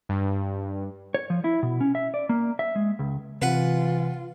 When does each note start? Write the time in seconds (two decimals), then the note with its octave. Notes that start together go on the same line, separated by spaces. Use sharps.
0.09 G2
1.14 C#5
1.30 F3
1.44 E4
1.63 B2
1.81 C#4
1.95 E5
2.14 D5
2.29 A#3
2.59 E5
2.76 G#3
2.99 C#2
3.42 C3 E3 F4 B4 F#5